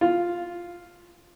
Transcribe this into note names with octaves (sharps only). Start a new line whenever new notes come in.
F4